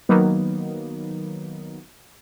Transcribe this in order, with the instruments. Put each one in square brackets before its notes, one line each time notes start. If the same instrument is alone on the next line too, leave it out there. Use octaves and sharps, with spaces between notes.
[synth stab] D#3 F#3 A#3 B3 D#4